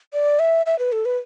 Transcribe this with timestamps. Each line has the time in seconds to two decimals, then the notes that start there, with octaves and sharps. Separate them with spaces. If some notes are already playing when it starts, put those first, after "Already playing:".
0.13 D5
0.39 E5
0.66 E5
0.79 B4
0.92 A4
1.05 B4